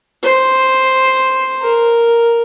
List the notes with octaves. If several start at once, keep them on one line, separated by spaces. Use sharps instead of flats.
C5
A#4